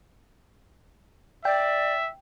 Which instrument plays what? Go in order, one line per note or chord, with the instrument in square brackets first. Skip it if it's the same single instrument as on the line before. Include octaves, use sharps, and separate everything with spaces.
[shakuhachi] D5 [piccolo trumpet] E5 [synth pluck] G5